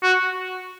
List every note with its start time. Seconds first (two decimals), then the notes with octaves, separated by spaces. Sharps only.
0.03 F#4